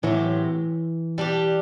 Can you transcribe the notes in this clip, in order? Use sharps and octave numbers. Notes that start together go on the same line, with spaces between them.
A2 E3 F#3 C4 G4
G3 D4 G4